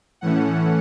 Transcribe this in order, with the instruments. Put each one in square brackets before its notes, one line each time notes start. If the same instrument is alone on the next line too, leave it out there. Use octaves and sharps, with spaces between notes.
[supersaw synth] A2 E3 A3 C#4 F#5